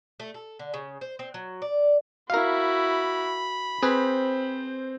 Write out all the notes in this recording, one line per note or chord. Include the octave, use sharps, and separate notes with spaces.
A3
A4
D3
C#3
C5
C4
F#3
D5
E4 F#4 A#4 F5 B5
C4 G#4 B4 C5